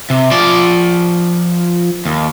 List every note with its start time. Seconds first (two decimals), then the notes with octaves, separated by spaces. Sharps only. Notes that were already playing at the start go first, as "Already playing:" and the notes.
0.10 C3
0.31 F3 D5
2.05 D#2